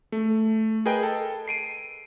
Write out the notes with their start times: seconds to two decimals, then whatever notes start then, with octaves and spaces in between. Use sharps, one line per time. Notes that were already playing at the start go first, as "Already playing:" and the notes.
0.12 A3
0.86 G#4 A#4 B4 D#5 G5
1.03 A4
1.48 C7 D7 D#7